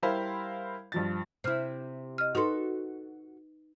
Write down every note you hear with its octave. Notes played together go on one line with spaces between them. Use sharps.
G3 E4 A#4 C5 F5 B5
G2 F3 A6
C3 E4 C5 F6
D#5 F6
D#4 F#4 A4 B4 C6